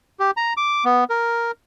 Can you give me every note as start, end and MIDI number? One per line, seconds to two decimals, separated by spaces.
0.20 0.31 67
0.37 0.53 82
0.57 0.84 86
0.85 1.04 59
1.10 1.51 70